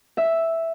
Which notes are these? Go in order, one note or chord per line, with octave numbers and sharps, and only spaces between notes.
E5